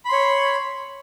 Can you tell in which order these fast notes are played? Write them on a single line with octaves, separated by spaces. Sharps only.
B5 C6 C#5